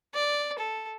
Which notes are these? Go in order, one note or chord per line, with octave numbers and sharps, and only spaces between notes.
D5
A4